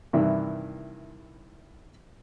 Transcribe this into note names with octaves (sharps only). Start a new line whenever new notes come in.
G2 C3 D#3 E3 E4